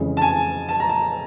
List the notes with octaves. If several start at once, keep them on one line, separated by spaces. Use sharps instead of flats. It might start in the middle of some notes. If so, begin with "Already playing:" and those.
Already playing: F2 C#3 E3 G#3 C#4
A5
G#5
A5
A#5
A5